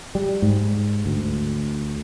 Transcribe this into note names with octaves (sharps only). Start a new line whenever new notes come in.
G3
G#2
D2